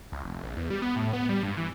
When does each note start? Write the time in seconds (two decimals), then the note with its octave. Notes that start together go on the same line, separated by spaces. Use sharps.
0.12 C#2
0.24 F1
0.44 A#1
0.56 E2
0.70 G3
0.82 B3
0.96 A2
1.13 B3
1.29 G3
1.43 G2
1.57 E3